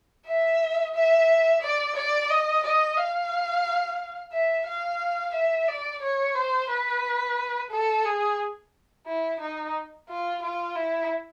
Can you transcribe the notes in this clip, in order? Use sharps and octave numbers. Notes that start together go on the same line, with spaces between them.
E5
E5
D5
D5
D#5
D#5
F5
E5
F5
E5
D5
C#5
C5
B4
A4
G#4
E4
D#4
F4
F4
E4